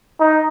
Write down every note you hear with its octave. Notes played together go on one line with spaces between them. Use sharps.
D#4